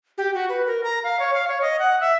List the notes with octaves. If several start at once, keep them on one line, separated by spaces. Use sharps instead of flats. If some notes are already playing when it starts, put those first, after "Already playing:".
G4
F#4
B4
A#4
A#5
F5
C#5
F5
C#5
D#5
F#5
E5